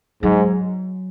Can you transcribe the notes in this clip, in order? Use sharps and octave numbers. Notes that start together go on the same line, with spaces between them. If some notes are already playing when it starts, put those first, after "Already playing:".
G#2 F#3